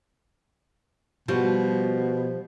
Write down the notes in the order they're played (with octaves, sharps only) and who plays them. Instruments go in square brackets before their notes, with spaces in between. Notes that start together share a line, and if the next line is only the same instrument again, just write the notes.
[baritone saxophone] B2 [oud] F3 G3 F#4